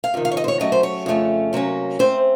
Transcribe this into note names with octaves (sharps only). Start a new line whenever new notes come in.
F5
F2 C3 D#3
F5
C#5
D#5
C5
C#5
C#3 F#3 A3 C#4 D#5
C5
C#5
F2 C#3 A3 C#4
C3 F#3 A#3 C#4
C#3 A3 C4 C5